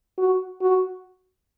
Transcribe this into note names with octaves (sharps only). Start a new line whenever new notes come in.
F#4
F#4